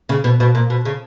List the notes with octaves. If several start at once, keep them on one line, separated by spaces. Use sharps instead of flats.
C#3
B2
B2
A#2
B2
C#3